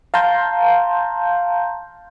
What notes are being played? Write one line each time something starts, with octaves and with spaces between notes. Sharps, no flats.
F5 A5 A#5 C6 G6